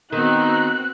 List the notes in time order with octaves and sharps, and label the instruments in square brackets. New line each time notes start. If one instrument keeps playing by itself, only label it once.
[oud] D#3 [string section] B3 C4 F#4 [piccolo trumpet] D#4 [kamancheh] F#6